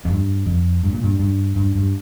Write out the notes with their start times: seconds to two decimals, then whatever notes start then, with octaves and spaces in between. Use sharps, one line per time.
0.05 F2
0.10 G2
0.46 F2
0.83 G2
0.93 A#2
1.04 G2
1.19 G2
1.56 G2
1.75 G2